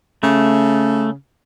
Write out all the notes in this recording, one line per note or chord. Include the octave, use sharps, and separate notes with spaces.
C#3 A3